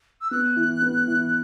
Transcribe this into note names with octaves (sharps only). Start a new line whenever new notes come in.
E6
B3 F#6
E3
B3
E3